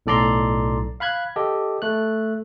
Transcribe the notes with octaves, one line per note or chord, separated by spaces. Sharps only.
B1 A2 A4 D5 A#5 C6
F5 B5 F#6 G#6
G4 A4 D#5
A3 F#6